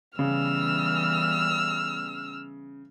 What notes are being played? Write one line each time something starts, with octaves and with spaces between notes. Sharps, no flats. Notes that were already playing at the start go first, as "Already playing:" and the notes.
C#3 E3 G3 B3 E6 F6